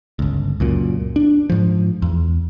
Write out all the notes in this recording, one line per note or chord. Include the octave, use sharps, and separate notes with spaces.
G1 C#2
C#2 F#2 A#2
D4
G#2 F3
E2